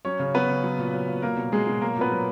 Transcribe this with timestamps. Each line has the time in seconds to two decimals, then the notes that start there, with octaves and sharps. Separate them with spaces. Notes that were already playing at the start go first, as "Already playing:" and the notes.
0.05 F#3 C#4 C#5
0.20 C#3
0.34 F#3 B3 B4
0.49 C#3
0.64 F#3
0.79 A#2
0.93 F#3
1.08 A#2
1.22 F#3 A#3 A#4
1.37 B2
1.52 F#3 G#3 G#4
1.67 B2
1.81 F#3 A#3 A#4
1.96 A#2 B3 B4
2.12 F#3